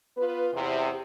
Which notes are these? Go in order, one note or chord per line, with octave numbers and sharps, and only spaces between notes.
B3 F4 B4
E2 C3